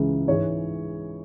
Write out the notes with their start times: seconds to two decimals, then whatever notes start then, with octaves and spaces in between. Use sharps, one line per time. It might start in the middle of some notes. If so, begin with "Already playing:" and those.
Already playing: C#2 C#3 E3 G#3
0.27 G#2 E3 G#3 C#5